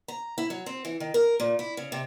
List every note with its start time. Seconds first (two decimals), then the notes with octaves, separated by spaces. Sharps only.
0.08 A#5
0.38 E4
0.50 F#3
0.66 C4
0.85 E3
1.00 D#3
1.14 A#4
1.40 A#2
1.59 E4
1.77 C#3
1.92 C3